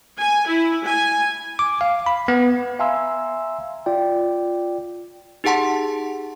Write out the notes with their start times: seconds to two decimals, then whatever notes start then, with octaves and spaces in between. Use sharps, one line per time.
0.17 G#5
0.47 E4
0.86 G#5
1.59 D6
1.81 F5
2.06 B5
2.28 B3
2.79 E5 F5 G#5 A#5 C6 E6
3.86 F4 D5 G5
5.44 D#4 G4 G#4 F#5 A5 C6